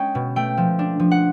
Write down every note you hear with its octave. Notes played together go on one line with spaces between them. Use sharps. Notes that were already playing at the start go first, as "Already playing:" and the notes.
Already playing: G#3 C#4 G5
B2
A3 G5
F3
D4
F3
F#5